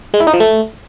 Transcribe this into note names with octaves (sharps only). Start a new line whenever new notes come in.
G#3
E4
D#4
F3
A3